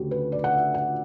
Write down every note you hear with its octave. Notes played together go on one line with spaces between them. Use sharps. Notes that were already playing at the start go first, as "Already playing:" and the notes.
Already playing: D2 C#3 F#4 G4
B4
D5
F#5
E5
F#5